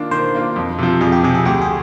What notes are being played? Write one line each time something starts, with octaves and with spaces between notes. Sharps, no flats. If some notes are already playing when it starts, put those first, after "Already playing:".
Already playing: D#3 A#3 D4 F4
D#3 C5
A#3 D4 F4
F2
C3 F3
F2 G#4
G4
C3 F3 G#4
G#4
D2 G4
G#4